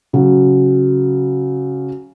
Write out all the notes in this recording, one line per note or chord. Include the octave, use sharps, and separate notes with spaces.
C#3 F#3